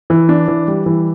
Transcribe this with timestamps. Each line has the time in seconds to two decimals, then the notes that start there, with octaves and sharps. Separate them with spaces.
0.10 E3
0.29 D4
0.48 E3
0.68 G3
0.86 E3